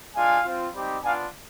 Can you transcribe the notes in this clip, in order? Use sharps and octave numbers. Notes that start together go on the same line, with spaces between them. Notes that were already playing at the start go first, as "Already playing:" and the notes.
G#3 D4 F4 F5 G#5
C4 F4
G3 C4 D#4 G4
B3 D4 F4 F5 G#5